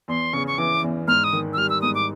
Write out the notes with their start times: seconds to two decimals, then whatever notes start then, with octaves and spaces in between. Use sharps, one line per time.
0.08 E2 C6
0.33 C#3 C#6
0.47 C#6
0.58 E3 D6
0.83 E2
1.08 G#2 F6
1.24 D#6
1.33 D#3
1.53 E6
1.57 G3 F6
1.70 E6
1.82 G#2 D#6
1.95 D6